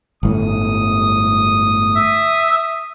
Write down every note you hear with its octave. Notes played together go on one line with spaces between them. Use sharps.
G1 A2 D#6
E5